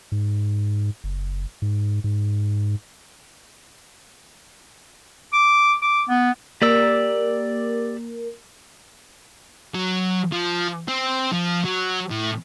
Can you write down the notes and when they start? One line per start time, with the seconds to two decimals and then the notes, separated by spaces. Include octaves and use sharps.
0.12 G#2
1.04 F#1
1.62 G#2
2.04 G#2
5.33 D6
5.82 D6
6.09 B3
6.62 A#3 G4 A#4 D5 E6
9.74 F#3
10.32 F3
10.88 C4
11.33 F3
11.65 F#3
12.11 A2